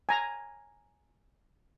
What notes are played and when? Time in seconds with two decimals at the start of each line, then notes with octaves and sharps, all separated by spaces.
0.09 G#5 A#5